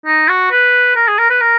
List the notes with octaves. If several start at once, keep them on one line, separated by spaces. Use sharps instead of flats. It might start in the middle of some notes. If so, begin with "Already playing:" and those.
D#4
F#4
B4
A#4
G#4
A#4
B4
A#4